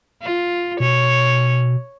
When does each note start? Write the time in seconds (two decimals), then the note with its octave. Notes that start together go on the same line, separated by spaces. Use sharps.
0.22 F4
0.80 B2 C#5